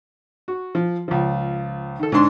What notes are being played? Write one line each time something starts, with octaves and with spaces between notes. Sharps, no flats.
F#4
F3
C#2 F3
D#3 A4
G#2 D3 D4 C6